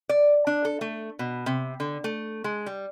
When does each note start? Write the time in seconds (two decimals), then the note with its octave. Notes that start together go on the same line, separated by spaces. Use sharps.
0.09 D5
0.47 D4
0.65 A4
0.81 A3
1.19 B2
1.46 C3
1.80 D3
2.04 A3
2.44 G#3
2.66 G3